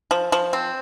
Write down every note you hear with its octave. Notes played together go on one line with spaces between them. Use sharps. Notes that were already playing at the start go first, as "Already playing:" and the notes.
F3
F3
C4